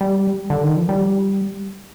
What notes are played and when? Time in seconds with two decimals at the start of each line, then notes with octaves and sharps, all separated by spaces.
0.01 G3
0.50 D3
0.63 D#3
0.76 F3
0.89 G3